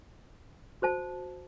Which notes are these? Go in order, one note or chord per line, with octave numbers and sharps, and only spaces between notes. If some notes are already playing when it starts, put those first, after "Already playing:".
F#4 C5 A5